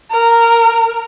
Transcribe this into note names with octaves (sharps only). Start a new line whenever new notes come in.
A#4